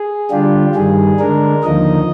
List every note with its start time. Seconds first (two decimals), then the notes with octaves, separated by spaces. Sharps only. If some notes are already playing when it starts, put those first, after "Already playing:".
Already playing: G#4
0.30 D3 G3 D4 F4 G4
0.75 G2 D#3 G3 G#4
1.19 D3 G#3 D4 A#4
1.63 D#2 D3 F3 A#3 D#4 D#5